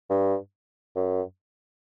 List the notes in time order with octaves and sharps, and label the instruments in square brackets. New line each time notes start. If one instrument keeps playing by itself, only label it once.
[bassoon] G2
F#2